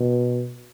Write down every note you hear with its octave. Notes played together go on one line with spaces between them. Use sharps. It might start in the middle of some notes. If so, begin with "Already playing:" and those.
Already playing: B2